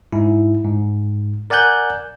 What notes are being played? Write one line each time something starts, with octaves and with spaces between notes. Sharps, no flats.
G#2 E4
G#2
A#4 D5 F#5 G#5 F#6 G6